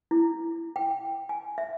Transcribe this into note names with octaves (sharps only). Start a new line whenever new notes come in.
E4
G5
G#5
E5